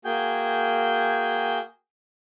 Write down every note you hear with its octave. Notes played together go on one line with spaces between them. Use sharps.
A#3 F#4 G#4 G5 G#5 G6